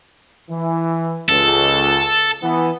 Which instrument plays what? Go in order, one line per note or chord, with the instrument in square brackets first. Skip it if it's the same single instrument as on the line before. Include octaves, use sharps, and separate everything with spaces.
[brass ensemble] E3
[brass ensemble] C#2 [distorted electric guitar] A4
[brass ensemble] E3 B3